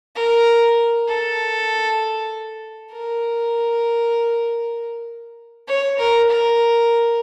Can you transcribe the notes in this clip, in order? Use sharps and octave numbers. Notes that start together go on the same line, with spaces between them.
A#4
A4
A#4
C#5
A#4
A#4